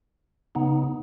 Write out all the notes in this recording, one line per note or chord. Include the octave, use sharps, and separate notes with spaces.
C#3 B3 D#4